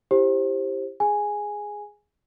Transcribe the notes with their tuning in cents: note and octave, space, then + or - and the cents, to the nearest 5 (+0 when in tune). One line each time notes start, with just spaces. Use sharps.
E4 +10 G4 +5 C5 +20
G#4 +0 G#5 +0